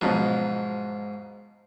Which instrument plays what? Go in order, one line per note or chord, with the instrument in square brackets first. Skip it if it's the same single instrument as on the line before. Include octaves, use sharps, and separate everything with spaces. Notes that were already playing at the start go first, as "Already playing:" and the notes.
[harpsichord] G#2 [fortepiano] B2 F3 F#3